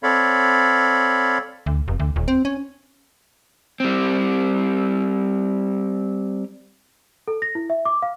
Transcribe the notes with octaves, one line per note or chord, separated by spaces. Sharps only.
C4 A4 C#5 D5 F5 B5
D2
F1
D2
D#1
C4
C#4
G3 C4
A4
A#6
E4
E5
D6
F5